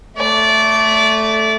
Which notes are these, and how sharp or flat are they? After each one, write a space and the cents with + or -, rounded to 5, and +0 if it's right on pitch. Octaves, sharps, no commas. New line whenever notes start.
A3 +0 D5 -20